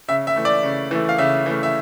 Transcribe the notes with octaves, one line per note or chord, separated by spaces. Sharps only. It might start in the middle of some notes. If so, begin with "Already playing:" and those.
C#3 E5
E5
E3 A3
D5
C#3
E3 A3
F5
C#3 E5
E3 A3
E5